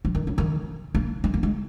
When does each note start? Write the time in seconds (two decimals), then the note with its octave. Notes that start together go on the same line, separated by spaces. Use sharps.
0.05 F3
0.15 D#3
0.27 C#3
0.38 D#3
0.95 A#3
1.24 G#3
1.34 A#3
1.43 G#3